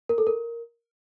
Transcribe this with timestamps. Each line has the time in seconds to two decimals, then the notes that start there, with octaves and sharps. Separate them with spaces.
0.09 A#4
0.18 A4
0.27 A#4